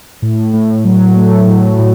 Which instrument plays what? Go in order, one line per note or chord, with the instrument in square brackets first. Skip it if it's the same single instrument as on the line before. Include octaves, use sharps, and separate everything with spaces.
[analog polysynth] A2
A2
F#3
A3
A2
A2